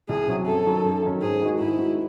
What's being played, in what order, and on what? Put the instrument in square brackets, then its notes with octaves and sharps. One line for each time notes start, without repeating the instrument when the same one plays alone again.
[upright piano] C2 [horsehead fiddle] G#4
[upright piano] C3 F#3 C#4 F#4
[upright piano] F#2 [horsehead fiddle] A4
[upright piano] D#3 F#3 C#4
F#2
D#3 F#3 C#4
[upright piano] G#2 [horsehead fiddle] G#4
[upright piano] D#3 G#3 D#4 F#4
[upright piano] G#2 [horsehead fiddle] E4
[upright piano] D#3 G#3 D#4 F#4